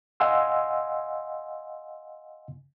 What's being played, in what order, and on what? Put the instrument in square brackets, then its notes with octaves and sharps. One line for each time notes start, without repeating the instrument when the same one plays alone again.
[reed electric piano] D#5 F5 F#5 G#5 C6 E6